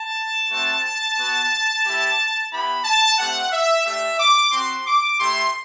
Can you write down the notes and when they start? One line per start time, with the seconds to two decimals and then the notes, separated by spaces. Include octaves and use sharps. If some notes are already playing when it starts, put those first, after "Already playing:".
Already playing: A5
0.51 A3 C4 F#4
1.18 B3 F#4
1.85 A3 E4 G4
2.52 B3 E4 G4 B5
2.85 A5
3.18 A3 C4 G4 F#5
3.52 E5
3.85 A3 D4 G4 E5
4.20 D6
4.52 C4 F#4 C6
4.86 D6
5.20 A3 E4 G4 C6